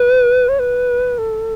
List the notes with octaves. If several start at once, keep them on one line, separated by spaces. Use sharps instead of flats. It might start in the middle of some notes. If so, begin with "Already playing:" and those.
Already playing: B4
C#5
B4
A4